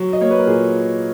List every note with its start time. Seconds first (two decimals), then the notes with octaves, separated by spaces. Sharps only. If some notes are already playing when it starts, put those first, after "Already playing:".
Already playing: F#3
0.13 D#5
0.21 A#3 C#5
0.31 B4
0.39 A#4
0.47 A#2 G#4